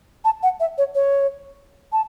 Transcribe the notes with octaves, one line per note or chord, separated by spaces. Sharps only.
A5
F#5
E5
C#5
C#5
A5